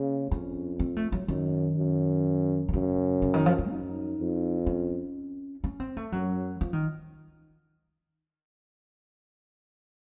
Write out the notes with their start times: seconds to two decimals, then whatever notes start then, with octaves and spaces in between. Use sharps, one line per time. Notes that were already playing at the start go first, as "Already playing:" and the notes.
Already playing: C#3 A#3
0.31 F2 C#4
0.79 C4
0.96 A3
1.12 F#3
1.28 F#2 D#3
1.77 F#2
2.69 D#3
2.73 F#2 C#3
3.22 C#3
3.34 D#3
3.46 F3
3.58 F#3
3.70 F#2 D#4
4.19 F2
4.66 C#4
5.64 C#4
5.80 C4
5.97 A3
6.12 F#2 F#3
6.61 F3
6.73 D#3